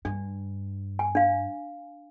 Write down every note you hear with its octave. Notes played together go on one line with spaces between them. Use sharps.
G2 D4
G#5
D4 F5